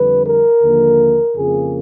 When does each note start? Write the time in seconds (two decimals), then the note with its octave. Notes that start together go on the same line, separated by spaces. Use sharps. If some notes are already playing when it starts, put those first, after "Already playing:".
Already playing: F2 D3 G3 B4
0.25 A#4
0.62 D#2 D3 F3 A#3
1.36 F2 C#3 F3 A#3 G#4